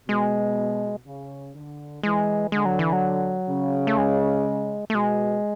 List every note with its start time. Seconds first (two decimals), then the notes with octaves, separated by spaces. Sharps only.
0.08 B2 G#3
1.06 C#3
1.55 D3
2.03 E3 G#3
2.52 D3 G#3
2.65 F#3
2.79 E3
2.93 F#3
3.49 C#3
3.87 A3
3.97 G#3
4.90 A3
4.94 B2 G#3